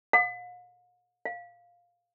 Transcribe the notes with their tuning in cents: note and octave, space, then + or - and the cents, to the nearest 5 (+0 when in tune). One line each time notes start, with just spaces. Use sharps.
F5 +45
F5 +5